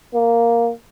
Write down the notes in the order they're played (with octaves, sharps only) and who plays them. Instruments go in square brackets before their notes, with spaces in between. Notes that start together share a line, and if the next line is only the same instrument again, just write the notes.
[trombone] A#3